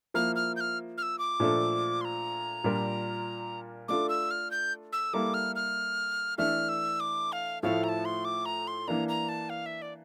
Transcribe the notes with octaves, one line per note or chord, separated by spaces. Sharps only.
F3 A#3 E4 F6
F6
G6
F6
F6
E6
D6
A#2 F3 A3 D4 A4
C6
A#5
A#2 G3 D4 F4 A#4
A3 D4 F4 A4 D6
E6
F6
G6
E6
G3 A#3 E4 A4 D6
F6
F6
E3 A3 D4 A4 E5 F6
E6
D6
F5
A2 F3 A3 E4 A4 F5
A#5
A5
C6
D6
A#5
C6
E3 A#3 D4 A#5
A#5
A5
F5
E5
D5